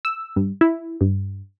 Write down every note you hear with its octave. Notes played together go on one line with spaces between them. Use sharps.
E6
G2
E4
G2